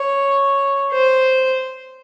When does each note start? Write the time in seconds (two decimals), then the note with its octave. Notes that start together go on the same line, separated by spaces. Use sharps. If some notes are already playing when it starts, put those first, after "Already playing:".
Already playing: C#5
0.92 C5